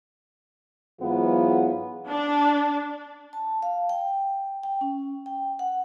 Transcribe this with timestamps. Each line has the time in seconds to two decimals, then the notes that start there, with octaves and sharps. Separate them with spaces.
1.01 G#2 E3 F#3 B3 F4 G#4
2.07 D4
3.33 A5
3.63 F5
3.89 G5
4.63 G5
4.81 C#4
5.26 G5
5.59 F#5